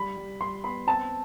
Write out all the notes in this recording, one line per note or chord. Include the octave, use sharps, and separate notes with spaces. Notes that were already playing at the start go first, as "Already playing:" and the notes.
Already playing: G3 B5
G3
G3 C6
B3 B5
C4 A5